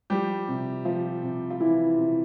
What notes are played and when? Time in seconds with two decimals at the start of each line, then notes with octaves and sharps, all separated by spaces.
0.10 F3 G3 G4
0.48 C3
0.85 F3 F4
1.23 C3
1.50 F4
1.60 E3 F3 E4
1.98 C3